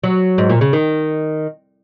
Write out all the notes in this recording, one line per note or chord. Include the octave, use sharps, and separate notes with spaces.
F#3
G#2
A#2
C#3
D#3